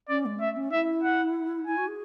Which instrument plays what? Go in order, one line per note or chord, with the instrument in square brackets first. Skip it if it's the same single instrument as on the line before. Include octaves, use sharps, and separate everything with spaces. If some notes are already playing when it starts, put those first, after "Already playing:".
[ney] C#4 [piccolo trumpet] D5
[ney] G#3
[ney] A3 [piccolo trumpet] E5
[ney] C#4
[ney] E4 [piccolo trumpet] E5
[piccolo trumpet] F#5
[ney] E4 [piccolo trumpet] G#5
[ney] F#4
G#4